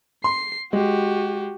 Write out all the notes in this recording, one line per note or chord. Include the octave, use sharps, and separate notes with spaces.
C6 C7
G#3 F#4 G4